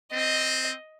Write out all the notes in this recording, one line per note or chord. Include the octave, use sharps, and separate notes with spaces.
C4 D#5